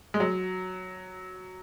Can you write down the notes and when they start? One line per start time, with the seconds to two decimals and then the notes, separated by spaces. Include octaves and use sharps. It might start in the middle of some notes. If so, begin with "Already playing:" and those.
0.14 G#3
0.20 F#3